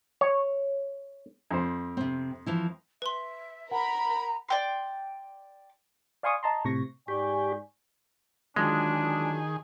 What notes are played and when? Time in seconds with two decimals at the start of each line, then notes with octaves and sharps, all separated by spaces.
0.21 C#5
1.51 F2 C5
1.97 C3 C4
2.46 E3 F3 E4
3.02 B4 E5 C6
3.71 A#4 F#5 A#5 B5
4.49 D5 G5 C6
6.23 D5 F5 G#5 C6 C#6 D#6
6.43 D#5 A5 A#5 C6
6.64 A2 C3 C#6 A#6
7.08 G#2 G4 D5 G#5 C#6
8.56 D3 D#3 F#3 G#3 D4 F4 G#4